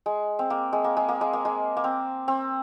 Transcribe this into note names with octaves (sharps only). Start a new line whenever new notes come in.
G#3
C4
A#3
G#3
A#3
G#3
A#3
G#3
A#3
G#3
A#3
C4
C4